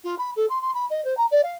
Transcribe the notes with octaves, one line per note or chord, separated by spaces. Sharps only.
F4
B5
A4
C6
C6
B5
D#5
C5
A#5
D5
F5